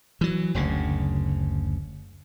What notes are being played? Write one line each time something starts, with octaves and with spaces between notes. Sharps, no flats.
E3 F#3
F#1 D2 C#3